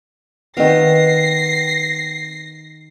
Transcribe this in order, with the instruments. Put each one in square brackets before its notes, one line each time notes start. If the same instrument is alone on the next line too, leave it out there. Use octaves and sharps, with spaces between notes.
[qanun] D#3 F5 [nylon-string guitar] B3 C4 [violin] A#6 C7